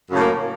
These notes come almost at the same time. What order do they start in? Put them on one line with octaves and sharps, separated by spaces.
F#2 C#3 A2 A#3